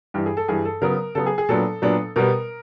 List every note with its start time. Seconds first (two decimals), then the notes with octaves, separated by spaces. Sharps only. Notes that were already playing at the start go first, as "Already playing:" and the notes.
0.14 G2 E3 G3 G4
0.26 G#4
0.37 A4
0.48 G2 E3 G3 G#4
0.65 A4
0.82 C#3 F#3 B3 A#4
1.15 C#3 F#3 B3 A4
1.26 G#4
1.38 G#4
1.49 A#2 F#3 B3 D4 A4
1.82 A#2 F#3 B3 D4
2.16 B2 G3 B3 A#4